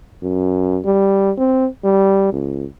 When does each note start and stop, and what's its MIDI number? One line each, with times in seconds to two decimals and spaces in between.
0.22 0.80 42
0.85 1.31 55
1.38 1.67 60
1.84 2.31 55
2.33 2.65 37